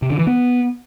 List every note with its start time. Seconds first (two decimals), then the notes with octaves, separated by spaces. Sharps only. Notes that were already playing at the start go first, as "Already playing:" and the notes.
0.02 C3
0.10 D3
0.19 E3
0.27 B3